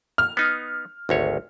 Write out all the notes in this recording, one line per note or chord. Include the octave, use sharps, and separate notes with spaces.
F6
B3 D#4
G#1 D2 C#5